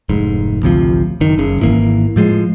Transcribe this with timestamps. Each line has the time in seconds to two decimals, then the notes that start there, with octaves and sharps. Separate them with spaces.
0.09 F1 G#2
0.62 A1 D2 C3 F3
1.21 F#1 D#3
1.38 F#1 C#3
1.60 G#1 E3 A#3
2.16 A2 F3 G#3